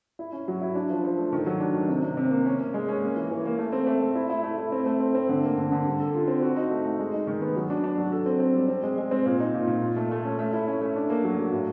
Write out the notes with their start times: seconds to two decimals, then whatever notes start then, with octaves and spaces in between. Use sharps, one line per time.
0.19 E4
0.33 C#4
0.48 F#3
0.61 E4
0.75 D4
0.90 F3
1.04 F3
1.18 A3
1.33 D#3
1.46 F#3
1.60 D4
1.74 D#3
1.88 C3
2.03 C3
2.17 C3
2.31 A#3
2.46 C#4
2.60 C#4
2.74 G#3
2.88 C#4
3.02 A#3
3.16 E3
3.31 E3
3.45 A#3
3.59 A3
3.73 C4
3.87 A3
4.02 A3
4.15 E4
4.30 E4
4.43 A3
4.58 E4
4.72 C4
4.86 A3
5.00 C4
5.15 C4
5.29 D3
5.44 A#3
5.58 D3
5.72 D3
5.86 G3
6.00 A4
6.15 F4
6.28 C4
6.42 F#4
6.57 D#4
6.71 A3
6.85 A3
6.99 G#3
7.13 D#4
7.27 D#3
7.41 B3
7.56 F#3
7.70 D4
7.84 D4
7.98 F#3
8.12 A4
8.26 C4
8.40 C4
8.55 G3
8.68 C4
8.83 G#3
8.98 G#3
9.11 C4
9.26 A#2
9.40 D#4
9.55 A#2
9.68 A#2
9.82 F4
9.96 A3
10.11 A3
10.24 C#4
10.39 A3
10.53 E4
10.67 C#4
10.81 A3
10.96 D4
11.10 A#3
11.24 F#3
11.38 F#3
11.52 A2